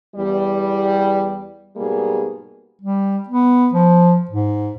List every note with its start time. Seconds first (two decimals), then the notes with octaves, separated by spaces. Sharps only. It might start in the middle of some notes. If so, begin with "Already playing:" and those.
0.16 E2 G3
1.77 G#2 B2 G3 A#3 G#4
2.81 G3
3.28 B3
3.74 F3
4.30 G#2